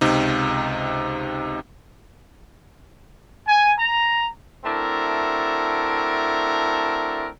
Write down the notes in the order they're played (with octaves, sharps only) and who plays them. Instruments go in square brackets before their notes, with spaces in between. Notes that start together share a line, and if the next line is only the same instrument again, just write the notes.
[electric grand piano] C#2 C3 D#4
[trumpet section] G#5
A#5
[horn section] A3 C4 D4 E4 F#4 A#4